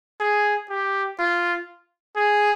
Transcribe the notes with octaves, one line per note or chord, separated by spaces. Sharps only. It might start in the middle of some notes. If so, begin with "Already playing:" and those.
G#4
G4
F4
G#4